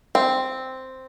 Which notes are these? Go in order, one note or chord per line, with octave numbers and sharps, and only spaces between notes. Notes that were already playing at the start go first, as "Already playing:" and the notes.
C4